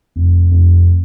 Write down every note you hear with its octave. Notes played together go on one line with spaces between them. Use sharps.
F1
F1